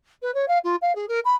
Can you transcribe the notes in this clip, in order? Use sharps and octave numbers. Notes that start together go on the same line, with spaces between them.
B4
C#5
F5
F4
F5
G#4
A#4
B5